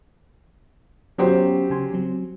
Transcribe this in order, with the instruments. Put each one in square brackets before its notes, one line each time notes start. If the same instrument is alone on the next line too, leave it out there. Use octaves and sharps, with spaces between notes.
[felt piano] F#3 G4 C5 [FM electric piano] B3 C#4 F4
[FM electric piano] C#3 G#5 C6
F#3 C4